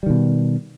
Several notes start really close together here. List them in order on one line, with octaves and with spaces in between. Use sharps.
G3 D#3 B2